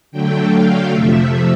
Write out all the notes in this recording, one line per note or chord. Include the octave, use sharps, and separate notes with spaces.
D3 F#3 A3 G5
F5
F2 C3 F3 A3 E5